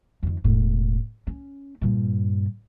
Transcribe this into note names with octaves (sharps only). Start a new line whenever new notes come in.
F2 D#3
E1 A2
C#4
G2 A#2